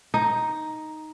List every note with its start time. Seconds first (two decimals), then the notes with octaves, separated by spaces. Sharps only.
0.14 D#4